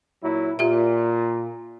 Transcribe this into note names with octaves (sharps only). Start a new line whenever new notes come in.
A#2 F#3 E4
A#2 F4 G4 E5